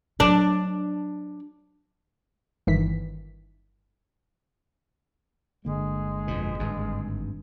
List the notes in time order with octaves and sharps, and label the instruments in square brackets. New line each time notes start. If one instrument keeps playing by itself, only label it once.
[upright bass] F#3 [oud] D4
[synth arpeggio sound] G1 D#3 E3 B6
[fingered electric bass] G1 D3 A#3 [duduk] G#3
[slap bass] F2 B2
G#1 G2